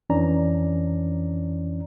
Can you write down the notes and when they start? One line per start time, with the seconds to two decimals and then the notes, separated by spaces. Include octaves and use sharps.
0.10 F2 E3 C#4 D4 D5 A#5